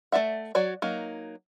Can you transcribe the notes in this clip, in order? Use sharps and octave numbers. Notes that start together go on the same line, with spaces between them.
A3 G#4 D5 E5 F#5
F#3 F#4 C#5 D5
F#3 A#3 D#4